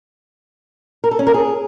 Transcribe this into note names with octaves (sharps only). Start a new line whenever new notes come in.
A#4
A4
C#4
A#4
G#4